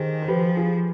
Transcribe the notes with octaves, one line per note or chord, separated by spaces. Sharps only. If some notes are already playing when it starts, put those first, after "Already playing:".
Already playing: D#3 G4 G#4 C5
C5
F3 G4 B4
F4 G#4